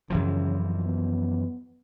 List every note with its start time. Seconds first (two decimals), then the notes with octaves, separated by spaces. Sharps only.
0.10 F#2 C#3 E3 F3
0.84 B3